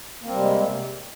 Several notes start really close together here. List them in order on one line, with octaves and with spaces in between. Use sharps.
A#3 C4 G3 C3 G#3